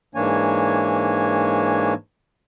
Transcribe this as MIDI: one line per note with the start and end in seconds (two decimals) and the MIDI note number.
0.15 1.94 44
0.15 1.94 52
0.15 1.94 58
0.15 1.94 62
0.15 1.94 73
0.15 1.94 80